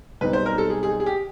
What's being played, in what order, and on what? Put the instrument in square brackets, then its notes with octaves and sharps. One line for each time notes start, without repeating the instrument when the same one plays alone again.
[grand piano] B1 B2 G3 C4 D#4 [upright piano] B4
[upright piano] C5
A#4
A4
G#4
G#4
G#4
G4